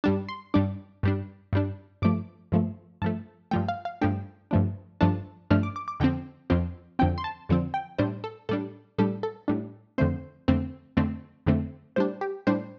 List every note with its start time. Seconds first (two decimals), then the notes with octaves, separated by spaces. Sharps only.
0.04 G2 G3 D4 A5
0.29 C6
0.54 G2 G3 D4 D6
1.03 G2 G3 D4
1.53 G2 G3 D4
2.02 G2 F3 A3 D6
2.52 G2 F3 A3
3.02 G2 F3 A3 A5
3.51 G2 F3 A3 G5
3.68 F5
3.85 F5
4.01 G2 F3 A3 D4 G5
4.51 G2 F3 A3 D4
5.01 G2 F3 A3 D4 A5
5.50 G2 F3 A3 D4 F6
5.63 D6
5.76 D6
5.88 D6
6.00 F2 D3 F3 C4 G5
6.50 F2 D3 F3 C4
6.99 F2 D3 F3 C4 G5
7.18 C6
7.24 A5
7.49 F2 D3 F3 C4
7.74 G5
7.98 A2 G3 D4 C5
8.24 A4
8.49 A2 G3 D4 A4
8.98 A2 G3 D4 A4
9.23 A4
9.48 A2 G3 D4
9.98 F2 D3 A3 C4 C5
10.48 F2 D3 A3 C4
10.97 F2 D3 A3 C4
11.47 F2 D3 A3 C4
11.96 A2 G3 D4 C5
12.21 G4
12.47 A2 G3 D4 C5